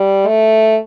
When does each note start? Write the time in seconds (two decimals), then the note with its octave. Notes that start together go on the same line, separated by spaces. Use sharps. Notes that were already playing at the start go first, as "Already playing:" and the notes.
Already playing: G3
0.27 A3